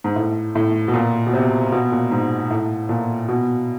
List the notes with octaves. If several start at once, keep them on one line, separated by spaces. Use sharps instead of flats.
G#2
A2
A2
B2
A#2
B2
C3
B2
A#2
G#2
A2
A#2
B2